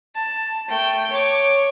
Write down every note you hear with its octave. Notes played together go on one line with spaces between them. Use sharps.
A5
A3 G5
C#5 D6